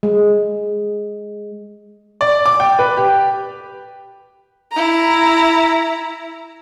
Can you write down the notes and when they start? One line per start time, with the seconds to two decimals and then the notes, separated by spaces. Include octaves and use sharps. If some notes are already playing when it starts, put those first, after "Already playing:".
0.03 G#3
2.21 D5
2.46 D6
2.60 G5
2.79 B4
2.97 G4
4.72 E4 A#5